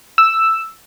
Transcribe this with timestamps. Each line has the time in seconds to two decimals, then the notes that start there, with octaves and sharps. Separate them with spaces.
0.18 E6